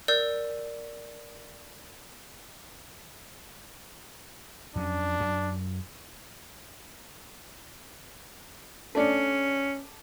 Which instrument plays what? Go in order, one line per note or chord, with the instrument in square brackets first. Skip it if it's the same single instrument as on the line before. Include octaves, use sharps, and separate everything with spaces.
[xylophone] A#4 D5 E6 G6
[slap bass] F2 F#3 C#4 [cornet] D4
[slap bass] F#2 F#3
[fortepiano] A3 D4 D5 [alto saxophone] C#4